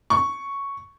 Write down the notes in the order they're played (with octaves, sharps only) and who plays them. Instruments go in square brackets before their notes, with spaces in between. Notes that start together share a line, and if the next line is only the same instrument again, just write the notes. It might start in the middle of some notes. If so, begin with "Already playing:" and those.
[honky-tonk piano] C#6